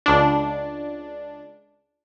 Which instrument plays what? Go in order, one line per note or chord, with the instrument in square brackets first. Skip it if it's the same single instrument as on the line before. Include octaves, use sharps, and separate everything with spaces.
[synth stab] C#2 D4